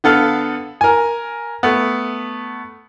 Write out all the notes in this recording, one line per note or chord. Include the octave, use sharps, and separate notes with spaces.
D3 B3 A4 F5
A#4 G#5
A3 B3